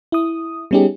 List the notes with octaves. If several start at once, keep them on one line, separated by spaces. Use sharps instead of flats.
E4 D#6
G3 B3 C#4 D#4 G4 G#4